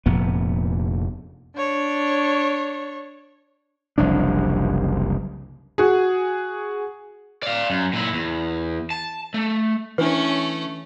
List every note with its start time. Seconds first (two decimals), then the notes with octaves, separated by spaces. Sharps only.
0.06 F1 F2 A#2 B3
1.56 D4 C#5
3.98 F#1 C2 F3 D4
5.78 F#4 G#4
7.43 D5 F5
7.70 F#2
7.93 A#2 E4
8.13 E2
8.90 A5
9.34 A3
9.98 E3 A3 C#4 D4 B4